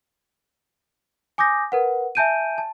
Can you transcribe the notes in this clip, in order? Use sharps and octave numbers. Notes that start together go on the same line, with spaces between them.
G#5 D6 D#6 G6 A#6
A#4 B4 F#5
E5 G#5 A5 G6 D7 D#7
A5